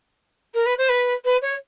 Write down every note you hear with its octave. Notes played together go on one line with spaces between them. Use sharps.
A#4
B4
C5
B4
B4
C#5